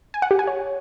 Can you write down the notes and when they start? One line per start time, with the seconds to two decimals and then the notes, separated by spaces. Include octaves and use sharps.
0.14 G#5
0.22 F#5
0.31 G4
0.39 G#5
0.47 C#5